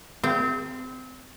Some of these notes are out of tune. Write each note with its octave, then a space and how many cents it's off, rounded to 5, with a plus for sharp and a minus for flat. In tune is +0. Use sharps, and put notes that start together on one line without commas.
C4 -25 F5 -40